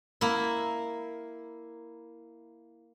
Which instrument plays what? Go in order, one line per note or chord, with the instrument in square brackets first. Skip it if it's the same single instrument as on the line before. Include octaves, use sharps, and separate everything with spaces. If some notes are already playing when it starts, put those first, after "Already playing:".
[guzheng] A#3 E4